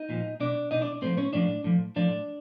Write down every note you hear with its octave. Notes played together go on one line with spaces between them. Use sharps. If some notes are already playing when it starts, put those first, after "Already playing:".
Already playing: D#4 D#5
A#2 F3
B2 D4 D5
B2 D#4 D#5
D4 D5
A2 F3 C4 C5
C#4 C#5
A2 F3 D4 D5
A2 F3
A2 F3 D4 D5